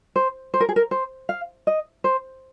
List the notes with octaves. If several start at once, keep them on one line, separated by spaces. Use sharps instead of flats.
C5
C5
A#4
G#4
A#4
C5
F5
D#5
C5